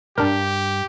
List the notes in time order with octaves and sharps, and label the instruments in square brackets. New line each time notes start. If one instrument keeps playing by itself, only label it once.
[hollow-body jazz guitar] B1 G2 [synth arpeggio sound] D4 A#4 [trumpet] G4